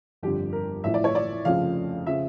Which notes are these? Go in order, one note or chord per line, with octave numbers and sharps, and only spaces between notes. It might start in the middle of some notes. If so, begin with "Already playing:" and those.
G1 F2 D3 G4
A#4
A1 A2 F3 E5
D5
C#5
D5
F1 F2 C#3 F3 F5
C#3 F3 E5